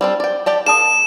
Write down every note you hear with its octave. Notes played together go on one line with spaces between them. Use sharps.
G3 C4 D4
D5 G5
G4 D5 A5
A#3 G#4 A5 D#6 E7